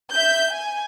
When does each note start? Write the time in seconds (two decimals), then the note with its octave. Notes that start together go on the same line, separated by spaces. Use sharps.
0.13 E5 G6
0.52 G#5